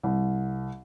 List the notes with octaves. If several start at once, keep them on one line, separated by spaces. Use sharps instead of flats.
C2